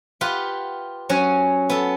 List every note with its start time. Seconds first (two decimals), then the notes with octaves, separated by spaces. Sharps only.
0.21 F4 G4 B4 F#5
1.09 F#3 C#4 C#5 G#5
1.70 B3 A4